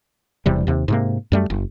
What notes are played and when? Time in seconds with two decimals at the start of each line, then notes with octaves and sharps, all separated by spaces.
0.46 E1 E2 C3 G3
0.67 D#2 C3
0.88 G#2 C3 A#3
1.32 F#2 G3 A3
1.50 F#1